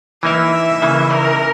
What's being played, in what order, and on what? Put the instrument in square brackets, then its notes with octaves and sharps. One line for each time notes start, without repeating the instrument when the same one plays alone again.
[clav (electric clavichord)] E3 A#3 D#4 A#4 [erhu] E5
[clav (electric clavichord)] C#3 E3 A#3 D#4
[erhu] A#4